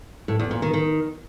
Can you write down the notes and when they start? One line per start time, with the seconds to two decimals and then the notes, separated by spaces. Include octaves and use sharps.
0.28 A2
0.40 E2
0.51 A#2
0.62 D#3
0.73 D#3